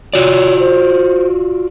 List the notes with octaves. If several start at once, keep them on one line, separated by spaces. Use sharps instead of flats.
F4 F#4 C#5 D5
C5